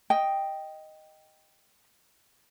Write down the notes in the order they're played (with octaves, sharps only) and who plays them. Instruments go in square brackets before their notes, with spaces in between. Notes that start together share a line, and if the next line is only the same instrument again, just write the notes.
[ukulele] D#5 G5